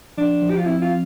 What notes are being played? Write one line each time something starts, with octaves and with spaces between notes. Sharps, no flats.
F3 D4
F3
G4
F4
C4 E4
F4